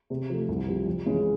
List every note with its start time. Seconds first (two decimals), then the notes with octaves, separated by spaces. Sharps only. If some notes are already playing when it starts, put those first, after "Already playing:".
0.10 C3
0.30 F3 A3
0.48 C2
0.68 C3 F3
0.86 F2
1.06 C#3 E3 G#3 C#4